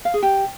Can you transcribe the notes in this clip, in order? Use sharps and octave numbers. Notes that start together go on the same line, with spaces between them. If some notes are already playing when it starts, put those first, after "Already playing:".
F5
G#4
G4